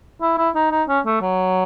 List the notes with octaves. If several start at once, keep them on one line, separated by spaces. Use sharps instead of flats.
E4
E4
D#4
D#4
C#4
A3
F#3